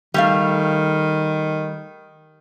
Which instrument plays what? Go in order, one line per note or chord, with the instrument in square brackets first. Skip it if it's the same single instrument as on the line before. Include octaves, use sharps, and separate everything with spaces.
[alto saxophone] D#3 [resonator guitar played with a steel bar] G3 A3 F5